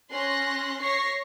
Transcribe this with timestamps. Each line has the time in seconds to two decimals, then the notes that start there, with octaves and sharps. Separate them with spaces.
0.10 C#4 C6 F#6 A#6
0.82 C#5 C#6 A#6 C7